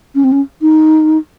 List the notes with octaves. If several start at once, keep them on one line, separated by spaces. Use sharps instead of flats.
C#4
C4
C#4
D#4